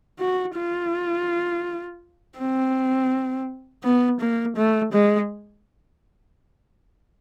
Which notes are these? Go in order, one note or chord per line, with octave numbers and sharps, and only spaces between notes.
F#4
F4
C4
B3
A#3
A3
G#3